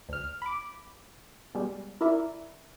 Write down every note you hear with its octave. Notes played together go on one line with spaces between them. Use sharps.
D2 F6
B5 D6
B2 G3 G#3
E4 A#4 D5 E5